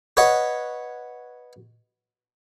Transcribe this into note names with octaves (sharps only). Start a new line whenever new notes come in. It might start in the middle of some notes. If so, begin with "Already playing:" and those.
B4 C#5 D#5 F#5